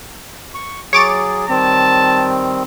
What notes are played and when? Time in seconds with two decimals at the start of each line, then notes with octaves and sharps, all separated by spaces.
0.54 C#6
0.93 F#3 G#4 C#5 D6 A6
1.49 D#3 G3 C4 A5